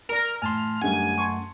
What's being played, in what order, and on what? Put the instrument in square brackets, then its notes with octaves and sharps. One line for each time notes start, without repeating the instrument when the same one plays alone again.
[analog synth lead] A#4 [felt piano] D5 A#5
[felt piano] A2 [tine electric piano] G#5 A5 C6 [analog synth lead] F6
[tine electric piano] F#2 A3 F#5 [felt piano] D3 G3 C#4 [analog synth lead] G#5
[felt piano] A5 C6 C#6